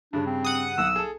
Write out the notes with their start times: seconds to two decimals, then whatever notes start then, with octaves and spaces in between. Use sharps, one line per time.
0.13 G2 C#3 D4
0.26 C4
0.44 F#5 D#6
0.78 B1 E6
0.96 G#4 A4